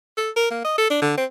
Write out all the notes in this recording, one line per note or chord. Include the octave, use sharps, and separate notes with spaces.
A4
A#4
A#3
D#5
A4
D4
D3
C4